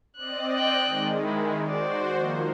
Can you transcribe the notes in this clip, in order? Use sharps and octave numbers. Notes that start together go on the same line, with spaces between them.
C4 D5 D#5 F#6
G5 F#6
D#3 G#3
E4
F#4 C5 D5
D#3 F3 A#3